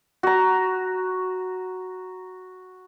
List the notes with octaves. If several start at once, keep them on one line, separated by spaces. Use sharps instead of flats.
F#4 A#5